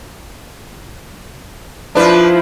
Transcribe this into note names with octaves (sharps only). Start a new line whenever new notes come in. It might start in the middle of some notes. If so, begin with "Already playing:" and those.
F3 D4 E4 B4